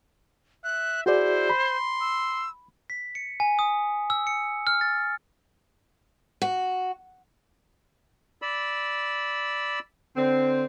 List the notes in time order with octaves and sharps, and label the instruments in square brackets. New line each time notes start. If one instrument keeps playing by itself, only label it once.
[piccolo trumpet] E5 [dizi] F#6
[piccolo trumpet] E4 [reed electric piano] F#4 G#4 D5 [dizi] C5
[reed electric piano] B5 [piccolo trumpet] C6
[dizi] E6
[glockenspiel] B6
C#7
G#5
D#6
E6
C#7
F6
A6
[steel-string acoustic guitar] F#4
[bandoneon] D5 B5 E6
[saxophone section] D3 C4